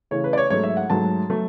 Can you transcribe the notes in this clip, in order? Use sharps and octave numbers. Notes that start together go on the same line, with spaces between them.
C#3 E3 A3 C#5
B4
D5
C#5
G#2 F#3 A3 C#5
E5
F#5
G#2 F#3 A3 A5
F#3 A3